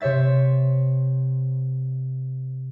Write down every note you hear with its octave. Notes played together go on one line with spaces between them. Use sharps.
C3 C5 C#5 E5 A6